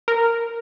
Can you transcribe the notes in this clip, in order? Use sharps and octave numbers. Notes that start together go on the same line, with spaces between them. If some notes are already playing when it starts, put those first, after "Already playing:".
A#4